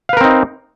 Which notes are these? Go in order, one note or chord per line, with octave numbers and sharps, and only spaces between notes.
C4 D#4 A#4 B4 F5